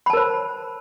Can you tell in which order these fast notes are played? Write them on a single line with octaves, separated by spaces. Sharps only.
B5 A5 A#4 C5